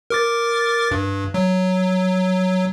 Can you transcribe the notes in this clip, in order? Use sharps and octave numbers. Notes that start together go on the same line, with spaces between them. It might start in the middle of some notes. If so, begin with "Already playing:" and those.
A#4 D6 A6
G2
F#3